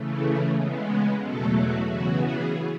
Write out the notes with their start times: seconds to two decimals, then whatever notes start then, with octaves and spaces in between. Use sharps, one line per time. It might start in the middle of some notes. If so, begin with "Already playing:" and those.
Already playing: C#3 E3 A3
0.55 C#3 G#3 B3
1.21 E2 B2 F#3 A3 A4
1.54 F#4
1.88 C#3 E3 B3 F#4
2.21 G#4